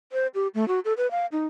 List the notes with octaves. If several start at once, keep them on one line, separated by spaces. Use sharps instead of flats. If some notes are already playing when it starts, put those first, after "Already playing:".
C5
G4
A3
F#4
A4
B4
F5
D#4